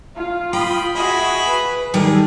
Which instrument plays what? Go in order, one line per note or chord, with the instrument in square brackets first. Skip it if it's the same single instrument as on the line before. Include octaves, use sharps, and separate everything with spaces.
[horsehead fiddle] F4 F5
[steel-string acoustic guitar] G5 [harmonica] B5 C6 D#6
[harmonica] E4 G#4 B5 [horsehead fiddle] F#4 D#5
[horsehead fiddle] B4
[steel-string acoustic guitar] D#3 G3 [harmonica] G#4 [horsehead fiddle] A4